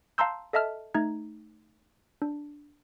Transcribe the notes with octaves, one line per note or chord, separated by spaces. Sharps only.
F5 A5 A#5 C6 E6 G6
A4 D#5 E5 A5 F6
A3 D#4 A#5 G#6
D4